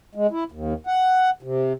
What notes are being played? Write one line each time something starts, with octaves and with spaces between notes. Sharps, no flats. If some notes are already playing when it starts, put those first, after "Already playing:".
G#3
E4
D#2
F#5
C3